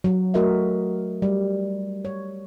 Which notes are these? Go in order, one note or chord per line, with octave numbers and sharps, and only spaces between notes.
F#3
A3 F#4 A#4 D#5 E5
G3
C#5